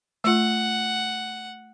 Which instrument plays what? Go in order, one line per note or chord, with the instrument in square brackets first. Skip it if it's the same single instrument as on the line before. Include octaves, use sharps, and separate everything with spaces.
[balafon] A3 F4 [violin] F#5